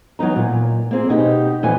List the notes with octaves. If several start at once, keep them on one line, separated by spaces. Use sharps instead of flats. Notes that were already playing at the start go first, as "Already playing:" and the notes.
E3 F#3 B3 D#4 A#5
A#2
A#3 C4 G#4
B2 D#4 G4
F2 A#2 E3 G#5